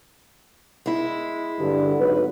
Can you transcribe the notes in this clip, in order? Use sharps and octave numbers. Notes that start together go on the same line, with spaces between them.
G#3 E4
G2 D3
G#1 F#3 B4